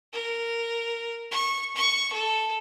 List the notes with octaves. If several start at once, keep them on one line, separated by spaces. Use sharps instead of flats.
A#4
C#6
C#6
A4